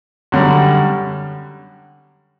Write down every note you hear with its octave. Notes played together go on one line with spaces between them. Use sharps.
F#2 D3 G3